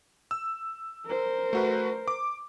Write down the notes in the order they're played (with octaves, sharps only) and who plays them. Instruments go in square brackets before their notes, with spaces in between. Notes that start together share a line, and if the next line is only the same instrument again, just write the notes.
[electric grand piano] E6
[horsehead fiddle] A#4 C5
[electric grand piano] A3 F#4 B4
D6